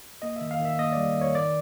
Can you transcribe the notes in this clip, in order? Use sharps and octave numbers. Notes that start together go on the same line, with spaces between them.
A#3 D#5
D#3 E5
F5
D#3
E5
A#3 D#5
G3 D5
D#3
C#5
D#3 D5